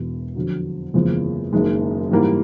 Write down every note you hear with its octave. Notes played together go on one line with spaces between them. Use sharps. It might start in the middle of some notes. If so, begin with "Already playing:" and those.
Already playing: E1 E2 B2
F2 D3 F#3
F#1 E2 C#3 F3 G#3
F#1 F#2 D#3 G#3
G#2 E3 G3 A#3